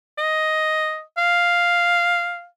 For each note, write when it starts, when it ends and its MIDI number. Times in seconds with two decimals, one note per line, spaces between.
0.18 1.01 75
1.18 2.46 77